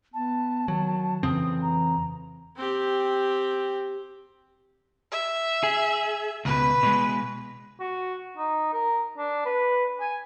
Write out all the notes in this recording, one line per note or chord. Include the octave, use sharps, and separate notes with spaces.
B3 A5
D#3 F#3
F2 C#3 E3 C4 D#6
A#5
C4 G4
E5
G#4
C#2 B2 B4
B2 G#3
F#4
D#4
A#4
D4
B4
G#5